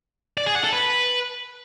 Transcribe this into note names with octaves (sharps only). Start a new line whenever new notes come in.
D5
G#4
F#5
A4
B4